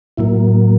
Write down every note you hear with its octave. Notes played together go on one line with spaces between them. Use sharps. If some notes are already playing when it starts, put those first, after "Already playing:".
A2 F#3 A#3 E4